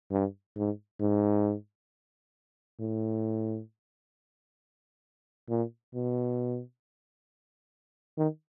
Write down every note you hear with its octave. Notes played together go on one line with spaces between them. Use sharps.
G2
G#2
G#2
A2
A#2
B2
D#3